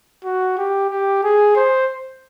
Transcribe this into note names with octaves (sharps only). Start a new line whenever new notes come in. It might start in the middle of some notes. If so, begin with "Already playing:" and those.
F#4
G4
G4
G#4
C5